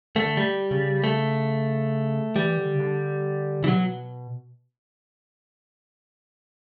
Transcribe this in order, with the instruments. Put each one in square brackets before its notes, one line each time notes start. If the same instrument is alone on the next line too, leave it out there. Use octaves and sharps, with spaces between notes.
[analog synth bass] D3 [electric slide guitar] A3
[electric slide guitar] G3
[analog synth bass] C#3
[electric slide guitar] A3
[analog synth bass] E3 [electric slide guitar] G3
[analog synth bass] D3
C#3
D3
[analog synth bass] C#3 [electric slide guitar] E3
[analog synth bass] B2 [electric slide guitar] F#3